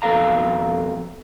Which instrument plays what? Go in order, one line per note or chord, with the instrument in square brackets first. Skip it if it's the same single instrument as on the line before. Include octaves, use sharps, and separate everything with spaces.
[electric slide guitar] F2 B2 A4 F5 A#5